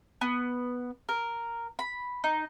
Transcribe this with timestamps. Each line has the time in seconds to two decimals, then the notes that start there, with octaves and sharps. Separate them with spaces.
0.21 B3
1.09 A#4
1.79 B5
2.24 D#4